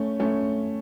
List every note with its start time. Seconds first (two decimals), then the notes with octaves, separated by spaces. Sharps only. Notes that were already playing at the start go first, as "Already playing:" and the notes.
Already playing: A3 C#4
0.20 A3 C#4